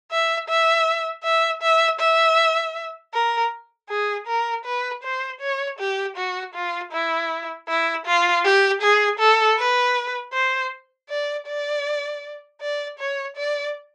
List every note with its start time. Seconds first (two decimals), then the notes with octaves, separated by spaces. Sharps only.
0.11 E5
0.49 E5
1.24 E5
1.62 E5
2.00 E5
3.14 A#4
3.90 G#4
4.27 A#4
4.65 B4
5.04 C5
5.41 C#5
5.79 G4
6.17 F#4
6.55 F4
6.93 E4
7.68 E4
8.06 F4
8.45 G4
8.82 G#4
9.19 A4
9.58 B4
10.33 C5
11.09 D5
11.47 D5
12.61 D5
12.99 C#5
13.37 D5